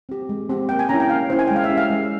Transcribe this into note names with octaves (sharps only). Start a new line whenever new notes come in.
C4 G4
G#3
C4 G4
A#3 G5
G#5
C#4 E4 A#5
G5
A#3 F5
C#4 E4 C5
G#5
G#3 G5
F5
E5
C#4 E4 G4
F5
G#3